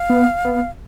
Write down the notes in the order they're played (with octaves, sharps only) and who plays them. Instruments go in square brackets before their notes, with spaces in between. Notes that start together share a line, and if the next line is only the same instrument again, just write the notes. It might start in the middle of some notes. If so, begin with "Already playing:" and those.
Already playing: [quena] F5
[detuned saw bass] B3
B3